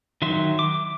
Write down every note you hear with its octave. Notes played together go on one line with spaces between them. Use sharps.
D#3 F#3 E5 C6
D6